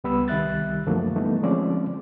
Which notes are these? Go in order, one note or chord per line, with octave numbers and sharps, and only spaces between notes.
C#2 G3 B3 B5 E6
C2 D#3 G3 E5 F#6 A6
F#2 D3 F3 F#3 A3 A#3
E3 G3 A3 B3 D#4
D3 F3 G#3 C4 C#4 D5